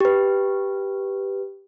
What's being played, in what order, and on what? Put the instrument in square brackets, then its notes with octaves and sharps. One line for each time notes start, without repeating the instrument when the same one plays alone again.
[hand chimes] G4 B4